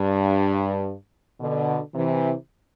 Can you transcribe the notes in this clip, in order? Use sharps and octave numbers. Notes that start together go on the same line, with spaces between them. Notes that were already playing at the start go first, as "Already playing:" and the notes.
Already playing: G2
B2 D3
C3 E3